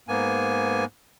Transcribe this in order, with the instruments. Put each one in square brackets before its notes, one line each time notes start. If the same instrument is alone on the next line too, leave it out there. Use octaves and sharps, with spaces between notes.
[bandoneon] G#2 A#3 B3 G#5